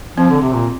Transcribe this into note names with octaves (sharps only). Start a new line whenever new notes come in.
F3 C4
D3
C3
A#2